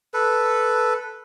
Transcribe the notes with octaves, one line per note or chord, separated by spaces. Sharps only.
A4 B4